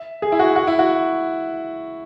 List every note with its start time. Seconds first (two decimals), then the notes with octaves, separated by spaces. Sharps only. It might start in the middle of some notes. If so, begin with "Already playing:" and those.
Already playing: E5
0.22 G#4
0.32 E4
0.39 F#4
0.56 F#4
0.67 E4
0.79 F#4